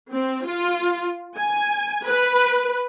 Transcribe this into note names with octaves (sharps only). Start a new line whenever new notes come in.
C4
F4
G#5
B4